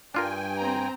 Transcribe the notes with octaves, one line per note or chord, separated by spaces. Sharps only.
G2 D4 F4 A#4 G5 G#5
C4 A#5